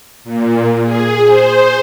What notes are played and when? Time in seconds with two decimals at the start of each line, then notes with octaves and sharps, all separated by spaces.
0.24 A#2
0.84 G#4
1.25 C5